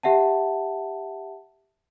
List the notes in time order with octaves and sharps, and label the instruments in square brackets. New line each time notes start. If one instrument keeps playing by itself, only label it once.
[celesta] G4 E5 F#5 A5